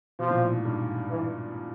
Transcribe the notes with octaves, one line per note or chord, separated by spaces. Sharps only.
B2 F3
A#2
A2
G#2
G2
E3